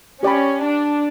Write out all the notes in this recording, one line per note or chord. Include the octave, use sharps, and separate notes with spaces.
C#4 G4 D5 G5 B5
D4